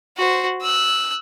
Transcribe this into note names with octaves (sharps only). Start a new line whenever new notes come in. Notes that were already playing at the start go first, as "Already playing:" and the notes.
F#4 C5
E6 F#6